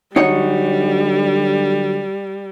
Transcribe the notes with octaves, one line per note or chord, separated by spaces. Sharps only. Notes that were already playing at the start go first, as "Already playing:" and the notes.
D3 F#3 G3 D#4 F#4 C#5